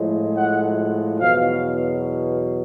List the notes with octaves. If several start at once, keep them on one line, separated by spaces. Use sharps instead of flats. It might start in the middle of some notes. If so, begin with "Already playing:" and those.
Already playing: A2 F3 G#3
F#5
E2 B2 F#3 F5